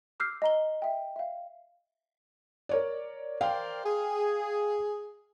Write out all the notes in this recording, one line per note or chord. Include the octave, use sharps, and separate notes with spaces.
D6 E6 F6 G6 C7
D#5 A#5 G7
E5 G5
E5 F5
A#4 C#5 D5
A#4 C5 D5 F5 G5
G#4